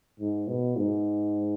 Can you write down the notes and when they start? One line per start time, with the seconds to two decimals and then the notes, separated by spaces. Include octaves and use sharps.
0.20 G#2
0.48 B2
0.77 G#2